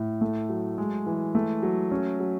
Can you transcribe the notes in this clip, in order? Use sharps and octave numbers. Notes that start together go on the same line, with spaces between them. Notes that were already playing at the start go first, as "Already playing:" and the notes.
Already playing: A2
A3
F#3
G#3
E3
A3
F#3
C#4
F#3